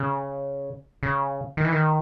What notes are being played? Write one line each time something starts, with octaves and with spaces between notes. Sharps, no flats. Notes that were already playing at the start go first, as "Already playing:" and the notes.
Already playing: C#3
C#3
D#3
E3
D#3